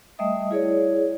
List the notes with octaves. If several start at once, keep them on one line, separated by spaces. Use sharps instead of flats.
G3 A3 D#5 E5 D#6
E4 G#4 C#5 D5